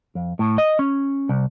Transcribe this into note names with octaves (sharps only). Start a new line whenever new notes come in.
F2
A2
D#5
C#4
C2